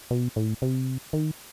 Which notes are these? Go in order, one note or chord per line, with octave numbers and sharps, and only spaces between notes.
B2
A2
C3
D#3